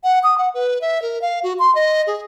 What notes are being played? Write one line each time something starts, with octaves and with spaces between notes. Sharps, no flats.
F#5
D#6
F#5
B4
E5
A#4
F5
F#4
C6
D#5
G#4